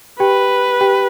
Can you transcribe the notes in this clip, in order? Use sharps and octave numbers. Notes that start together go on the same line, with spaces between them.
G4 B4 G5
G4 G5